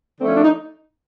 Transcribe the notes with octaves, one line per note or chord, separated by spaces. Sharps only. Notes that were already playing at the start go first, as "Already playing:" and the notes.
D3 F3 A3 C4
C#4
D4
D#4